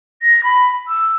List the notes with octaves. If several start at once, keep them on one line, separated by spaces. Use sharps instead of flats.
A#6
B5
E6